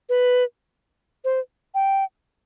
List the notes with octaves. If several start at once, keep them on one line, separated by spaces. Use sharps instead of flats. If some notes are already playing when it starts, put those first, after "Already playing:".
B4
C5
G5